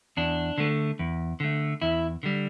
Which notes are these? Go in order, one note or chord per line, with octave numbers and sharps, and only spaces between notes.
E2 D4
D3 A3
E2
D3 A3
E2 E4
D3 G3